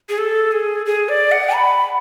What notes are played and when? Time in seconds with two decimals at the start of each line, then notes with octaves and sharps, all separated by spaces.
0.09 G#4
0.18 A4
0.52 G#4
0.86 G#4
1.09 D5
1.32 F#5
1.54 B5